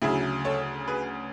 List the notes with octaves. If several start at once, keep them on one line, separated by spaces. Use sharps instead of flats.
D2 C#3 F#3 E4 G#4
A4 C#5
G#4 B4